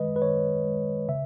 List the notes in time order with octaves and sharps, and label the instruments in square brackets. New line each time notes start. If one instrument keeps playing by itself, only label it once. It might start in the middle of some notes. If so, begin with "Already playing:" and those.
Already playing: [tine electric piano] D#3 G#3 B4 D#5
B4
D#3 C#5
G#3
C#3 E5